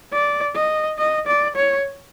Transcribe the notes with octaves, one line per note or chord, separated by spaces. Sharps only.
D5
D#5
D#5
D5
C#5